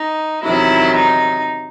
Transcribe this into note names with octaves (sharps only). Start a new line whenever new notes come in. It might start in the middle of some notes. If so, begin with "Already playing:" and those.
Already playing: D#4
E2 C3 D#3 F#3 E4
D#4